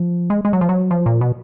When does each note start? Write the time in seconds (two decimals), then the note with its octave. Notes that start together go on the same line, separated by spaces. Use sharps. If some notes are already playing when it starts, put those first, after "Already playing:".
Already playing: F3
0.30 G#3
0.45 G#3
0.53 F#3
0.61 F3
0.69 F#3
0.91 F3
1.06 A#2
1.21 B2